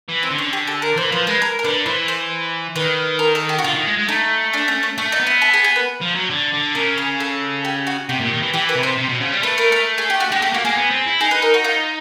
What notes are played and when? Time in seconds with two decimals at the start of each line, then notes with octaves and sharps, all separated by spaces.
0.08 E3
0.23 C4
0.30 D3
0.38 C#4
0.53 G4
0.67 A4
0.82 A#4
0.97 E3 C5
1.12 F3 B4
1.27 G#3 B4
1.42 A#4
1.59 A#4
1.64 D3 B4
1.86 E3 C5
2.08 C5
2.76 D#3 B4
3.19 A#4
3.35 A4
3.49 G4
3.59 F#4
3.64 D3 F4
3.75 D#3
3.86 G#3
3.98 G#3
4.09 A3 D#4
4.53 D4
4.68 C#4
4.83 C#4
4.98 A3 D4
5.12 D#4
5.19 B3
5.27 E4
5.42 A4
5.54 G#4
5.64 G#4
5.76 B4
6.02 F3
6.16 F#3
6.30 D3
6.54 D3
6.75 C#3 A#4
6.98 G#4
7.20 A4
7.65 G4
7.87 F#4
8.09 C3 G4
8.21 A#2
8.31 D#3
8.43 E3
8.54 E3 G4
8.69 B4
8.76 C3
8.83 C5
8.98 C3
9.09 B2
9.21 C#3
9.32 G3
9.43 A3 B4
9.58 A#4
9.72 A#4
9.98 G#4
10.10 G4
10.20 F#4
10.31 G#3 G4
10.42 A3 G4
10.53 A#3 F#4
10.65 A#3 G#4
10.77 B3
10.91 C4
11.06 E4
11.20 D#4 G#4
11.31 B4
11.42 A#4
11.54 F#4
11.64 F4